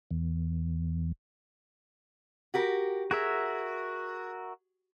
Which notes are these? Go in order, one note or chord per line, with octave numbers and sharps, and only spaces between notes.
E2
F#4 G4 A#4
F#4 G#4 A#4 E5